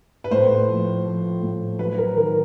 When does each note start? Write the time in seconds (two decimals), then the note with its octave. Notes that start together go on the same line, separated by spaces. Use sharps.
0.24 B4
0.31 A2 C5
0.68 F3
1.05 F3
1.42 A2
1.79 F#3 B4
1.98 A#4
2.16 D#3 A#4